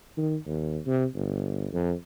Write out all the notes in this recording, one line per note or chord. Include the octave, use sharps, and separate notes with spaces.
D#3
D#2
C3
G1
F2